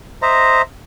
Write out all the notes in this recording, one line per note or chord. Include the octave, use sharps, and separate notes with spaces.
C5 D#5 E5 A#5